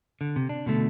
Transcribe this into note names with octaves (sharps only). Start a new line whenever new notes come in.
D3
C3
D4
B2 D3 A3